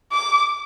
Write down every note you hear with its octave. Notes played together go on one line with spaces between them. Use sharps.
D6